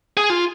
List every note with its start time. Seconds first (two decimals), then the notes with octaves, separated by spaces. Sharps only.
0.17 G#4
0.30 F4